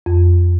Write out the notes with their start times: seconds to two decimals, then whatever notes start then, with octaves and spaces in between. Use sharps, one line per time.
0.06 F2